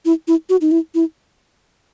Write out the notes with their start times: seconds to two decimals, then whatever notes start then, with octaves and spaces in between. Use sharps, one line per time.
0.05 E4
0.28 E4
0.50 F#4
0.61 D#4
0.72 E4
0.95 E4